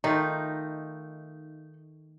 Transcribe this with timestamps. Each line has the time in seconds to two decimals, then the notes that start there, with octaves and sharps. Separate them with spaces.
0.04 D#3 A3 D#4 F4